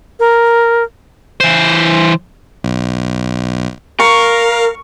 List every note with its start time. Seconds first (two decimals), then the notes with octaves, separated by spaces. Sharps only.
0.20 A#4
1.40 E3 C5
2.64 B1
4.00 A#4 F5 C#6